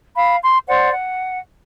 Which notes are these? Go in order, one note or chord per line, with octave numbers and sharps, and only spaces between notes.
F5 B5
C6
C5 D5 F#5
F#5